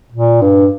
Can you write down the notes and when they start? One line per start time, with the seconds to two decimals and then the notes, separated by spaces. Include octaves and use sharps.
0.12 A#2
0.42 G2